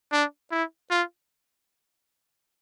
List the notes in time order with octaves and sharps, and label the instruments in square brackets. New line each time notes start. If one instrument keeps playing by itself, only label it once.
[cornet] D4
E4
F4